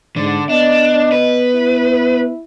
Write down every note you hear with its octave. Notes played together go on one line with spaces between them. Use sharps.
G#2 D3
B3 D4 D#5
B4
E4